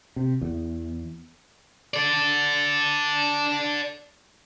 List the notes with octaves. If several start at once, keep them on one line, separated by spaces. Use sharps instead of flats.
C3
E2
A4 D5